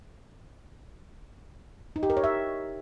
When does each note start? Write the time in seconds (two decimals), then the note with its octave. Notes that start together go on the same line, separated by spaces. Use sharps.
1.96 D#4
2.03 G4
2.10 A#4
2.17 C#5
2.24 E5